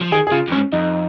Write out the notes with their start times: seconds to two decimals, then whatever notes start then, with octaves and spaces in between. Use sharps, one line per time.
0.01 F3
0.12 D#3 G#4
0.27 G#4
0.32 C#3 F4
0.48 F2
0.52 G#2 C#4
0.72 F2 D#4